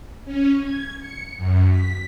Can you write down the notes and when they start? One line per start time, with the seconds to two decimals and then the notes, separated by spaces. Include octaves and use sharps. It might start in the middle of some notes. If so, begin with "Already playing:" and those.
0.25 C#4
0.61 G#6
1.00 C#7
1.37 F#2
1.68 B6